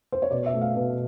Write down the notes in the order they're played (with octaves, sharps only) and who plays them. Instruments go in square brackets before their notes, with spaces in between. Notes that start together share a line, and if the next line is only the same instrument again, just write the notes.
[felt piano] C5
C#5
B2 D5
E5
A3
F5
B2